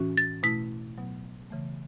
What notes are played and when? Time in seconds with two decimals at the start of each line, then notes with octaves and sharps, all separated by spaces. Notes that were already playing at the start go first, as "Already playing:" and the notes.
Already playing: A2 E3 C#4 F#4
0.17 A6
0.43 B2 A3 E4 B6
0.98 B2 F#3 B3
1.50 C#3 E3 A3